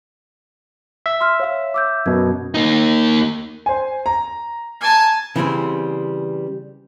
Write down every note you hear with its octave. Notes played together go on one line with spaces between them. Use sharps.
E5
C6 E6 F6
C#5 F5 E6
D6 E6 G6
F#2 B2 G#6
A#3 D#4
C5 G#5
A#5
G#5 A5
C#3 E3 G3 C4